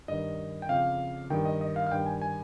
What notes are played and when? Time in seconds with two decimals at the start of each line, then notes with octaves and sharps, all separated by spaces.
0.08 G2 D#3 D#5
0.62 G5
0.69 F2 C#3 F5
1.30 G2 D#3 G5
1.45 D#5
1.61 D#5
1.76 F5
1.87 F5
1.92 G2 D#3 G5
2.06 G#5
2.21 G#5